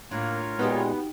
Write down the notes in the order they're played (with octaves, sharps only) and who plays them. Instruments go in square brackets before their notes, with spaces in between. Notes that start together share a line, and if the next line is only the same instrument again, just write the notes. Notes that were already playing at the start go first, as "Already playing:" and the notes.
[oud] A2 D4 [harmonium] A#3 [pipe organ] F4 A#4 C#5
[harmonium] A#2 G#3 [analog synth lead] B3 [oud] D#4 F#4 G4